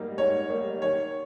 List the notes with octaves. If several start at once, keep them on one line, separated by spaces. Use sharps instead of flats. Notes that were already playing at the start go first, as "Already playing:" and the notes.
Already playing: G#2 G3 A#3 D#4
G#2 C#5
G3 A#3 D#4
D#3 C#5